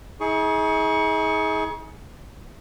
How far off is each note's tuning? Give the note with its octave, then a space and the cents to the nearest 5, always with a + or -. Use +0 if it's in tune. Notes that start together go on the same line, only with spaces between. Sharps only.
D#4 +45 G#4 +15 C#6 +10